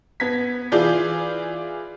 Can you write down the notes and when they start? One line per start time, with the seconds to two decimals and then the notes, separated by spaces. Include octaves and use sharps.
0.20 B3 G#6 B6
0.72 E3 F4 G#4 D5 G6